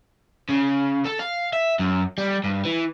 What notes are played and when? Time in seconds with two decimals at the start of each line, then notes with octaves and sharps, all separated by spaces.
0.50 C#3
1.05 A4
1.20 F5
1.53 E5
1.79 F#2
2.18 G3
2.44 G2
2.65 E3